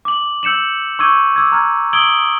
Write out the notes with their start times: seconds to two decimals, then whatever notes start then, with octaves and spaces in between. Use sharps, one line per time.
0.05 D6 F#7
0.43 E6 G6 C#7 E7 F#7
0.99 C#6 D6 E6 G6 G#6 D#7
1.36 D6 E6 G#6
1.52 A#5 F6 G#6
1.93 D#6 E6 G#6 D7 F#7 G7